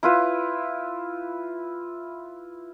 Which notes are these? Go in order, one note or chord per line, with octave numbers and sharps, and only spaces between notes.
E4 F4 B4